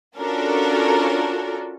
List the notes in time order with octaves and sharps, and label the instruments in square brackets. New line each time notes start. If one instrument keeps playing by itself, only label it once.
[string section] C#4 D4 F4 F#4 A4 A#4